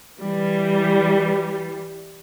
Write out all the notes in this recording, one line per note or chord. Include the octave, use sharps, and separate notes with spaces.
E3 G3